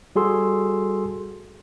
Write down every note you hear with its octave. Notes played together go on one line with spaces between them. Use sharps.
G3 F#4 G#4 A4 C6 E6